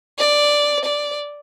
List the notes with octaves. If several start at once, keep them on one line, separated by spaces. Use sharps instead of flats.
D5
D5